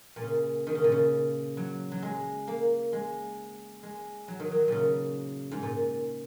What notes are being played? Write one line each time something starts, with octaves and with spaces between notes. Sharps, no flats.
A#2
C#3
D#3
C#3
A#2
C#3
F#3
F#3
G#3
A#3
G#3
G#3
F#3
D#3
F#3
A#2 C#3
G#2
A#2